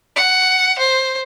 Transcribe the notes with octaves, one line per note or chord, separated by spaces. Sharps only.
F#5
C5